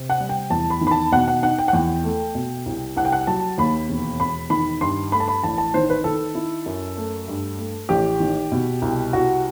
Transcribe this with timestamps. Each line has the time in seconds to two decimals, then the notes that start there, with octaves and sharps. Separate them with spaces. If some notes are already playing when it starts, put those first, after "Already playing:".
Already playing: C3
0.10 F#5
0.20 G3
0.29 G5
0.50 E2 A5
0.70 B5
0.81 D#3
0.87 B5
0.91 A5
1.12 B2 F#5
1.28 F#5
1.42 D#4 F#5
1.58 G5
1.68 F#5
1.73 E2 G5
2.04 A3
2.35 B2
2.66 C2
2.96 C2 F#5
3.05 G5
3.12 F#5
3.27 F#3 A5
3.58 D#2 B5
3.89 E1
4.19 E1 B5
4.50 D#3 B5
4.81 G2 C6
5.12 A3 B5
5.20 A5
5.28 B5
5.43 A1 A5
5.58 A5
5.74 D#3 C5
5.90 B4
6.04 D#3 A4
6.35 E4
6.66 F#2
6.97 A3
7.28 G2
7.58 A3
7.89 A1 G4
8.20 D#3
8.52 B2
8.82 C2
9.13 C2 F#4